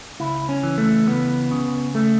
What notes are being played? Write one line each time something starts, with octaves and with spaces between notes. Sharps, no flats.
C#2 E4
C#4
E3
A3
C#2 B3
C#3
A3